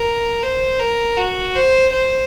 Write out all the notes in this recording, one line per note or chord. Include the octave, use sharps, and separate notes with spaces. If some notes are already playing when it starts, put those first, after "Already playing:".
Already playing: A#4
C5
A#4
F#4
C5
C5